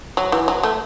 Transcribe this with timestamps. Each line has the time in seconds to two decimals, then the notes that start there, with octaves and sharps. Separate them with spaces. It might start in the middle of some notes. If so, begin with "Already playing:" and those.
0.17 F#3
0.32 E3
0.48 F#3
0.63 A3